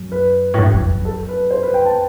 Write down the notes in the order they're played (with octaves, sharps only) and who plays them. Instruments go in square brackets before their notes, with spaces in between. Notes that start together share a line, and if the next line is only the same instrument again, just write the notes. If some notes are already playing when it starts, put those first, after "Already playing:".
Already playing: [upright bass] F#2
[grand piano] B4
[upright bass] A2
G2
F#2
F#2
[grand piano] A4
B4
C5
B4
G5
A5